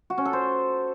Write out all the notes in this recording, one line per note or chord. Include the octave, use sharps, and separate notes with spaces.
F#4
C#4
A4
C5